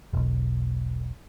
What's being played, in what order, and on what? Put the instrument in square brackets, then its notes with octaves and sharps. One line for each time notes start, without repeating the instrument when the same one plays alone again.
[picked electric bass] E1 B1